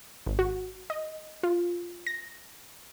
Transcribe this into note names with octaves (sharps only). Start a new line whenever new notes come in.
G#1
F#4
D#5
F4
A#6